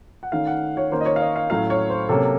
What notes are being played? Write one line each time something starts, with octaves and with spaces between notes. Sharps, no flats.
F#5
D#3 A3 C#4 F5
F#5
C#5
D#3 A#3 C#4 C5
D#5
C#5
F5
D#5
F5
A2 F#3 A3 C#4 F5
C#5
C5
C3 F#3 A#3 C#4 A4